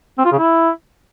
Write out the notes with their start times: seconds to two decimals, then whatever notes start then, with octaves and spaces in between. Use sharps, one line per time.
0.18 C4
0.25 F4
0.32 C#3
0.39 E4